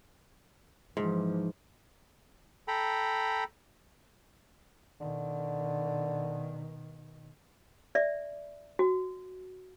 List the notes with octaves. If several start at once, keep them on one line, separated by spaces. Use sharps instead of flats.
G#2 E3 F3
A4 G5 A#5 B5
B2 D3 D#3
D5 E5
F#4